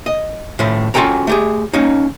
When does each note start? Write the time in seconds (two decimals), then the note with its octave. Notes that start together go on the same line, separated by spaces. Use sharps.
0.06 D#5
0.59 A2 F3 A3
0.94 C#4 F4 F#4 A4 G5 A#5
1.27 A3 G4 G#4
1.73 A#3 C#4 D#4